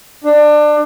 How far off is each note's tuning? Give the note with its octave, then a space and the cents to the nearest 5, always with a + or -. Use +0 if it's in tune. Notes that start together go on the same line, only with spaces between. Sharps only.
D4 +25